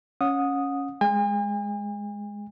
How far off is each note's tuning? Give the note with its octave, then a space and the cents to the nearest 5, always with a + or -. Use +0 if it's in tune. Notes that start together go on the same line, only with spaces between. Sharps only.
C#4 +0 F#5 -35 D#6 +0
G#3 +0 G#5 -45